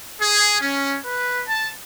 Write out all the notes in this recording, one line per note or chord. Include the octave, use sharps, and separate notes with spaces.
G#4
C#4
B4
A5